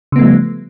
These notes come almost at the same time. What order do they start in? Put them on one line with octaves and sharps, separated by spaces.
C#3 B3 A3 F3 G3